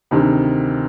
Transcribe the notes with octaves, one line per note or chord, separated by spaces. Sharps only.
D2 C3 D#3